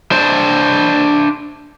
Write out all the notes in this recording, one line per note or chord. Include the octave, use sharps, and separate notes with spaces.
D4 C5